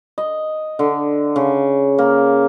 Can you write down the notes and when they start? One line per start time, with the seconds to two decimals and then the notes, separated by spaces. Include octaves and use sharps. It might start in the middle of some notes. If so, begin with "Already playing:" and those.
0.18 D#5
0.79 D3
1.36 C#3
1.98 A#3